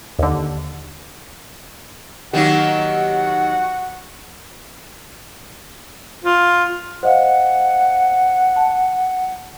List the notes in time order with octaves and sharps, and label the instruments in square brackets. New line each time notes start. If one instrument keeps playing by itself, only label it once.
[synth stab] D#2 D3
[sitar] D#3 F#3 A#3 [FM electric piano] D#4 G4 [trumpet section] F#4 F#5
[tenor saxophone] F4
[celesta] C5 D#5 F5 [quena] F#5
[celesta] A5